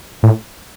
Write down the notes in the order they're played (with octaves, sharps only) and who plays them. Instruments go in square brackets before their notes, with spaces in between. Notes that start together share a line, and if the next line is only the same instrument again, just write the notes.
[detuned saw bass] A2